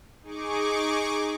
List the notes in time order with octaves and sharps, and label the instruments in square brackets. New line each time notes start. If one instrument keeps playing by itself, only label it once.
[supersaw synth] D#4 G#4 C#6 D6